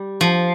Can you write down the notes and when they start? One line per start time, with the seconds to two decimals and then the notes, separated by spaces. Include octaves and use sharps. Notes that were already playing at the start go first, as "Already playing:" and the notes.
Already playing: G3
0.21 F3